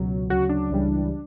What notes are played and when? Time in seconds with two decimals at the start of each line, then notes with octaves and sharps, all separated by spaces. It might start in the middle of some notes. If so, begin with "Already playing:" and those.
Already playing: C#2 B2 F#3
0.29 D2 C#3 F#3 F#4
0.49 D4
0.71 C#2 C#3 E3 G3